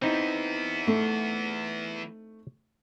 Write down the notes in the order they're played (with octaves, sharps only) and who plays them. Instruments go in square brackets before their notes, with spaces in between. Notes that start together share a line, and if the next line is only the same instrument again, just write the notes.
[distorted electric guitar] E3 B3 [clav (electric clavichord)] C4 D#4 E4
[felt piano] A3